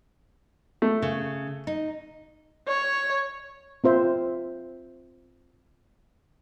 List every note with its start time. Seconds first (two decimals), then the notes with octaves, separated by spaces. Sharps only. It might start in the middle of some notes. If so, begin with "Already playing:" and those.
0.82 A3
1.02 C#3
1.67 D#4
2.68 C#5
3.84 C4 F4 C5 E5